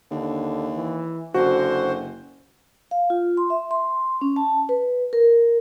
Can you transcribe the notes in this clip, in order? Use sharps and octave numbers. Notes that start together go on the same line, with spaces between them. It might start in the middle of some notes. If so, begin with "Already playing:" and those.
D#2 D3
E3
F#1 D3 F#4 C5
F5
F4
C6
E5
C6
C#4
A5
B4
A#4